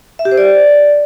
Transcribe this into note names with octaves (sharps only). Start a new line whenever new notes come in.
E5
G4
C5
D5